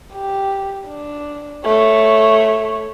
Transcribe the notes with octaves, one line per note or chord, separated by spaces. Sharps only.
G4
D4
A3 C#5